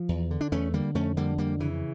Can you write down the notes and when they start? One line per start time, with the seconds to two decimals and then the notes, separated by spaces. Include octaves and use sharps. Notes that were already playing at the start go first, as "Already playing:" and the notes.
Already playing: F3
0.09 E2
0.31 D3
0.41 D4
0.52 E2 A3 C#4
0.73 D3 G3 A#3
0.95 F2 A3 C#4
1.17 D3 G3 A#3
1.38 F2 G3 A#3
1.60 C#3 E3